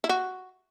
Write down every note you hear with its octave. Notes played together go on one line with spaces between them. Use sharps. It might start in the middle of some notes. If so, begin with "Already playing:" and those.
E4
F#4